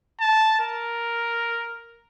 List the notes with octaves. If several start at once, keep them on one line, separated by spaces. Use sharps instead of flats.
A5
A#4